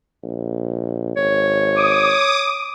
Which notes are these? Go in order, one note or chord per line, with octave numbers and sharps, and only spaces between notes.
A#1
G#1 C#5
D6 D#6